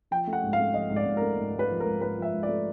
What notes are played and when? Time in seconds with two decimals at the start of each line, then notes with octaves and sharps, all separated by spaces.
0.11 F3 G5
0.27 A3
0.33 F#5
0.43 G#2
0.53 F5
0.59 A3
0.74 F3 D#5
0.90 G#2
0.96 D5
1.06 G#2
1.17 A#4
1.22 A3
1.37 G#2
1.54 G#2
1.59 B4
1.70 F3
1.80 A#4
1.85 G#2
2.01 G#2 B4
2.18 F3 E5
2.33 G#2
2.43 D5
2.49 A3